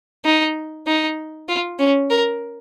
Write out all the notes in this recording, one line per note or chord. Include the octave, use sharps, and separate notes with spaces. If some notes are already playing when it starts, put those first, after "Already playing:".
D#4
D#4
F4
C#4
A#4